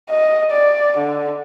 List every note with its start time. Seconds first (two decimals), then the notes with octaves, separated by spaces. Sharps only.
0.10 D#5
0.51 D5
0.97 D3